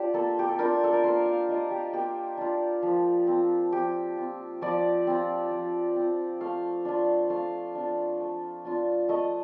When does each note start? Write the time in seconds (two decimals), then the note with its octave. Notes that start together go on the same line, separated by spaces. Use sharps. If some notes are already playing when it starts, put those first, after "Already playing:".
Already playing: D4 F4 G4 C5 D5
0.14 A#3 A4
0.39 G4
0.48 A4
0.59 D4 F4 A#4
0.84 A4
0.93 A#4
1.04 A#3 C5
1.26 F5
1.48 D4 F4 D#5
1.71 G4
1.93 A#3 G4
2.38 D4 F4
2.83 F3
3.27 C4 F4
3.72 F3 G4
4.17 C4 F4
4.62 F3 D5
5.07 C4 F4
5.51 F3
5.96 C4 F4
6.41 A3 F5
6.85 D4 F4
7.30 A3 F5
7.75 D4 F4
8.20 A3
8.65 D4 F4
9.09 A3 D#5